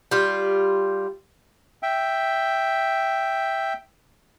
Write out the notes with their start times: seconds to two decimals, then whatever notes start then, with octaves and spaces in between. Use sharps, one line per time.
0.11 G3 F4
1.83 E5 G5